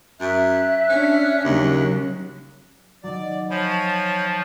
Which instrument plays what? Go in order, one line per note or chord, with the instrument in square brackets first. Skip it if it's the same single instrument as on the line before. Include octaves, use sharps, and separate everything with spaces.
[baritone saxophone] F#2 [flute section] E5 [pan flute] F#6
[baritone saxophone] C#4 [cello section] D4
[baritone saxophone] D#2 [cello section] C#3 F#3 C#4
[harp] D#3 F#3 [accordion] D5
[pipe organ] F3 [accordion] C#5 G#5 B5